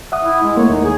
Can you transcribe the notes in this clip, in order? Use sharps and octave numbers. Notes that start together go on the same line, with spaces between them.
E5 F#5 D#6
E4
G#3
A3 A#3 C#5
D#2 D#4
G#4